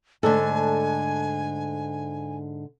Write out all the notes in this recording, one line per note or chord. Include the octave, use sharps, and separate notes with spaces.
G#2 D3 A3 D4 A4 G#5